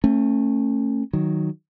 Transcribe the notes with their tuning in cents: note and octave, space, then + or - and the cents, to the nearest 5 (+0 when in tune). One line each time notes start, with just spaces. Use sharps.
A3 +25 C#4 -25
D#3 +0 F#3 +0